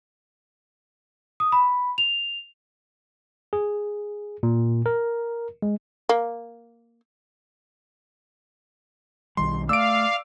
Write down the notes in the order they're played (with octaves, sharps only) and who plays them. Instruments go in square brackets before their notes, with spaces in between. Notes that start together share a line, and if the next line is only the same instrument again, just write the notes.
[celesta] D#6
B5
F7
[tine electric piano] G#4
A#2
A#4
G#3
[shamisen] A#3
[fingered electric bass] B1 D#3 G3 [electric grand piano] C6
[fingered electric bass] A3 [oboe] D5 [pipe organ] F5 [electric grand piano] E6 D7